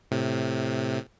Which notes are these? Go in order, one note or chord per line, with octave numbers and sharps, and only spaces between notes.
A2 C3